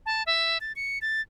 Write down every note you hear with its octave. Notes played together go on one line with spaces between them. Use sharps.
A5
E5
A6
C#7
A6